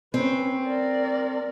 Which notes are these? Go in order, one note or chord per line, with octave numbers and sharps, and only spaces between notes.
C4 C#4 B4
A#4 D5